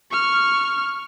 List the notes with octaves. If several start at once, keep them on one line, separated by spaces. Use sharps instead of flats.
C#6 F6